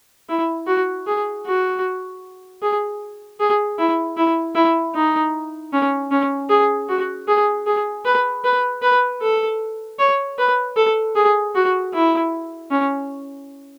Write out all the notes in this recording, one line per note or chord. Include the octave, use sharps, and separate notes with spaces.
E4
F#4
G#4
F#4
G#4
G#4
E4
E4
E4
D#4
C#4
C#4
G#4
F#4
G#4
G#4
B4
B4
B4
A4
C#5
B4
A4
G#4
F#4
E4
C#4